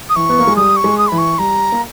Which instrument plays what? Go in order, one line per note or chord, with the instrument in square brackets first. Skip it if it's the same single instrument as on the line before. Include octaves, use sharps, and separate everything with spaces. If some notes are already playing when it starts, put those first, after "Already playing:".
[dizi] D#6
[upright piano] E3 [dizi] C#6
[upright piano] B3
A#3
G#3
[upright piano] G3 [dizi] D#6
[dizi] C#6
[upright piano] G#3
[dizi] D#6
[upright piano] E3 [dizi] B5
[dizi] C#6
[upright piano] G3 [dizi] A#5
[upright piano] A#3